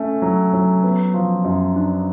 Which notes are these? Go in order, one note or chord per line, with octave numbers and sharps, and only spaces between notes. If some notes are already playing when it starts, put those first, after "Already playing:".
Already playing: A3 C#4
F#3
F#3
B3
F3
F#2
D4